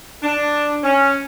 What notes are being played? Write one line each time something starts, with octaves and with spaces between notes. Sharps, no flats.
D4
C#4